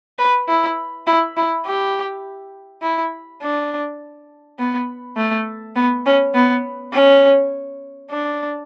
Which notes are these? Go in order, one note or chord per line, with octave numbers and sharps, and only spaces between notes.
B4
E4
E4
E4
G4
E4
D4
B3
A3
B3
C#4
B3
C#4
D4